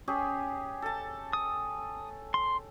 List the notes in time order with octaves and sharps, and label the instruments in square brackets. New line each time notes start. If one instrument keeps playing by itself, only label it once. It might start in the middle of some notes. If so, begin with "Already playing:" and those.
[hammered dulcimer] C#4 G4 G#4
A4 A5
[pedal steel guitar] D#6
C6